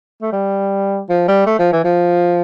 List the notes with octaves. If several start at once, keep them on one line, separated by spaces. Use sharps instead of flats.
A3
G3
F3
G3
A3
F3
E3
F3